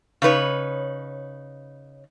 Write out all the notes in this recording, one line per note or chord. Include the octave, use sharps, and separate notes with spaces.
C#3 D#4 B4 C#5